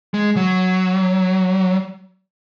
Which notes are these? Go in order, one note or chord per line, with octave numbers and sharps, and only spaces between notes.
G#3
F#3